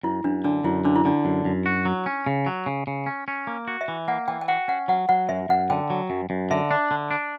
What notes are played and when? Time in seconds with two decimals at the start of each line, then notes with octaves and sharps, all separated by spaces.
0.03 F#2 E4
0.24 F#2 D4
0.44 D3 D4
0.64 F#2 E4
0.85 D3 D4
0.96 E4
1.05 D3 D4
1.25 F#2
1.45 F#2
1.66 F#4
1.85 F#3
2.06 C#4
2.27 C#3
2.46 F#3
2.66 C#3
2.87 C#3
3.06 C#4
3.28 C#4
3.47 A#3
3.68 F#4
3.81 E5
3.88 E3
4.08 A#3 F#5
4.28 E3 G5
4.41 G5
4.48 F#4 F#5
4.68 C#4 F#5
4.88 F#3 F#5
5.09 F#3 F#5
5.29 F#2 E5
5.49 F#2 F#5
5.70 D3 G5
5.90 F#3
6.10 F#2
6.30 F#2
6.51 D3 E5
6.71 D4
6.91 D3
7.11 D4